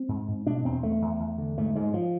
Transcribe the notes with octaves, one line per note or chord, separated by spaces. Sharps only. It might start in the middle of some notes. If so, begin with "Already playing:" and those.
Already playing: C4
G#2
G#2
B2 D4
E2 C4
E2 A3
E2
E2
D3
G#2 A3
G#2 G#3
F3